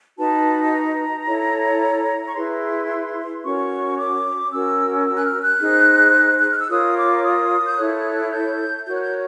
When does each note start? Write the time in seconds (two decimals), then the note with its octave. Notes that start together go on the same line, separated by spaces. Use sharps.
0.17 D#4 F#4 B4 A5
0.62 A5
0.72 A#5
1.26 E4 A4 C#5
2.27 C#6
2.35 E4 G#4 B4 C6
3.44 C#4 F#4 A#4 C#5 C#6
3.97 D6
4.52 C#4 F#4 A#4 E6
5.06 E6
5.18 F#6
5.24 F6
5.43 F#6
5.60 D#4 G#4 C5
6.39 F#6
6.50 F6
6.60 E6
6.69 F4 A#4 C#5 D#6
6.96 D6
7.24 D#6
7.66 G6
7.78 E4 A4 C#5 F#6
8.32 G6
8.86 F#4 A#4 C#5 G6
8.95 F#6
9.02 G6